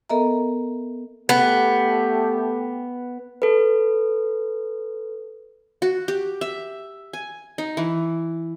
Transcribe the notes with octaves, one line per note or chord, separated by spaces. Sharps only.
B3 A4 A#4 D#5 E5 A#5
A3 B3 G4
A4 B4
F#4
G4
E5
G#5
D#4
E3